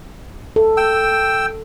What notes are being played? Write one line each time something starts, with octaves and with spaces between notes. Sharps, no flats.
A4
G5 E6